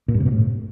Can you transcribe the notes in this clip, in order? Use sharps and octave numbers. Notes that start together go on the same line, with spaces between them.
A#2
G2
C3
B2
A2